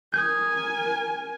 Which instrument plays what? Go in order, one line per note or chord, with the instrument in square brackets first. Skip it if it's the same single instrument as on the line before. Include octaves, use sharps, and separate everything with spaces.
[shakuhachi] A#4 [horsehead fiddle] G#5 [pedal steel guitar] D#6 G6